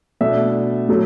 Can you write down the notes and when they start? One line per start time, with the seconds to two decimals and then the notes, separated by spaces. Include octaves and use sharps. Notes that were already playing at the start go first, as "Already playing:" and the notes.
0.21 B2 A3 D4 E5
0.89 B2 F#3 A3